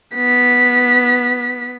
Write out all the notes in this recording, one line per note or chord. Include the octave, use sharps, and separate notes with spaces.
B3 B6